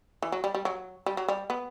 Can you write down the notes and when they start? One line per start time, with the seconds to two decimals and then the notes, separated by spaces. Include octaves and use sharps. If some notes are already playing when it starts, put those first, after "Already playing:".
0.22 E3
0.32 F#3
0.44 G3
0.54 G3
0.65 F#3
1.06 G3
1.17 F#3
1.28 G3
1.50 B3